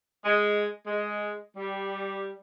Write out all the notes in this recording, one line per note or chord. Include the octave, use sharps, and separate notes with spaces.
G#3
G#3
G3